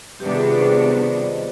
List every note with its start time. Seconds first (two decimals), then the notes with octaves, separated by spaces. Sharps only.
0.20 C3 D#3 G3 B3 D4 G4 B4
0.34 F4 G#4
0.47 G4 B4
0.60 G#4 C5
0.73 B4 D5
1.00 B4 D5
1.27 C5 D#5